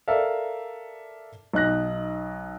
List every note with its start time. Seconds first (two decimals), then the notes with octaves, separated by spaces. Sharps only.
0.08 A4 A#4 D5 E5 F5
1.54 B1 D#4 F#6 A#6